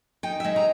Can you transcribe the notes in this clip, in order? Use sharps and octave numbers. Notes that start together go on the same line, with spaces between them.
D#4 G5
E5
G#3 D#5
A#5